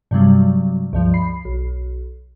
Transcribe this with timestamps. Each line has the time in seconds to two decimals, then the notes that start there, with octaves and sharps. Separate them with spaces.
0.11 G2 C3 F#3 G3
0.93 C#2 G2 F3
1.14 B5 C7
1.45 B1